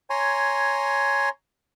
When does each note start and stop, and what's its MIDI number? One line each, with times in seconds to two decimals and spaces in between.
0.10 1.29 73
0.10 1.29 80
0.10 1.29 82
0.10 1.29 84